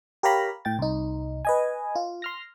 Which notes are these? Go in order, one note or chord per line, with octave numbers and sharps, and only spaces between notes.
G4 A#4 C#5 F5 A#5 B5
A2 G5 A6
C2 D#4
B4 D#5 G#5
F4
C6 F6 A#6